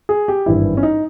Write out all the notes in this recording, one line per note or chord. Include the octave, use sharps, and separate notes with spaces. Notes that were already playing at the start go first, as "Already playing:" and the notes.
G#4
G4
G#1 G2 E3 E4
C#4
D#4